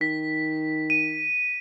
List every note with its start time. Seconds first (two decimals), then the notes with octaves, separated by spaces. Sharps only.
0.01 D#3 B6
0.90 D#7